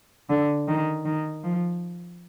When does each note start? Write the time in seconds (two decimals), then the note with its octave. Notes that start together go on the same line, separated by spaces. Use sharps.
0.30 D3
0.68 D#3
1.05 D#3
1.43 F3